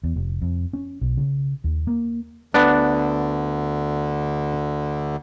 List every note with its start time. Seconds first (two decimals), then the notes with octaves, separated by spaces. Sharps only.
0.04 E2
0.16 F1
0.42 F2
0.73 C#4
1.01 B1
1.17 C#3
1.64 D#2
1.87 A#3
2.54 D2 D3 B3 D4